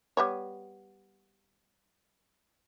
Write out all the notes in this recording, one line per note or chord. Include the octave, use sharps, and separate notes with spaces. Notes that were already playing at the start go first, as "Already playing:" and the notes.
G3 B3 C#5